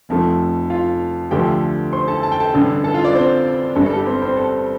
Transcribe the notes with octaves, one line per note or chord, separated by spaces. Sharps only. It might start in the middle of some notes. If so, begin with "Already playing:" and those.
F1 F2 F3 A3
F4 F5
D2 D3 F3 A3 G4 G5
C5 C6
A4 A5
A5
G5
A4 A5
A1 G2 D3
A4 A5
F4 F5
D4 D5
C4 C5
G1 G2 G3 A4
A4
G4
C4 C5
C4 C5
A4